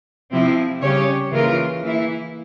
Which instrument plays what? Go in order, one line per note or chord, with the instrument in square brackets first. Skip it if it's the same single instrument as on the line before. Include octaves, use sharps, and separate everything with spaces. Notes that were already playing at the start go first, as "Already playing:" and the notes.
[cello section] C3 F3 C4 E4
C#3 G3 C#4 G4 C#5
C#3 E3 A#3 F4 A#4
E3 A#3 E4